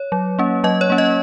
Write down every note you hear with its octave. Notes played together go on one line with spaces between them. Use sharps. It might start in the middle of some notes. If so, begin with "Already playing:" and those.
Already playing: C#5
F#3
A#3 C#4
F#3 D#5
C#5
A#3 C#4
D#5